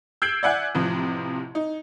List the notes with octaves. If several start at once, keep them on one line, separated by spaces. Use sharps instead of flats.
E6 G6 G#6 C7 D7 F#7
D5 E5 F#5 G#5 F#6 G#6
A1 C3 F3
D#4